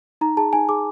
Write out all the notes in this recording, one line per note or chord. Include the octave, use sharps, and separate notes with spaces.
D#4 A#5
G#4 A5
D#4 G#5
G#4 D6